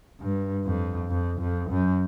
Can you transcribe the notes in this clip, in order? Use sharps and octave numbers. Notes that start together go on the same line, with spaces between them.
G2
F2
F2
F2
F#2